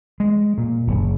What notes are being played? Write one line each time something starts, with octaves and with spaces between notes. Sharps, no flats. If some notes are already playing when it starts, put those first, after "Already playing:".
G#3
A#2
F#1